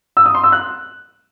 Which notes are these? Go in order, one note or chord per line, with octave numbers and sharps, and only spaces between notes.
E6
D#6
C6
E6
F#6